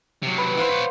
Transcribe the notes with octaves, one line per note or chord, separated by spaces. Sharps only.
C3 F#3
B4
E3 C5 F5 F#5
B4 C#5